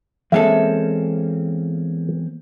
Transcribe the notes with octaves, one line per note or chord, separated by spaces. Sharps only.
E2 G#3 A#3 C4 C#4 A4 E5